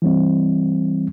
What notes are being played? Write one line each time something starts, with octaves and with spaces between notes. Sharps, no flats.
E3 G3 C4